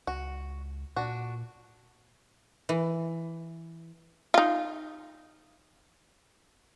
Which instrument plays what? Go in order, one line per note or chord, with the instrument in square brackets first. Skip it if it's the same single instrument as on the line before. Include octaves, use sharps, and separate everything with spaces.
[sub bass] C#2 [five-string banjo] F#4
[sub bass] A#2 [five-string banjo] D4 F#4
[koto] E3
[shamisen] D#4 F4